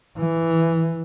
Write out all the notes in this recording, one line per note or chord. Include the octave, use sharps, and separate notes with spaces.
E3